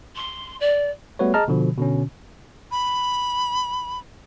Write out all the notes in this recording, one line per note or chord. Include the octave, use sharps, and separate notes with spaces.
C6
D5
G3 A3 B3 F#4 B4 C#5
G#4 D#5 A5 A#5 F6
B2 D3 F3
B2 D3 C#4
B5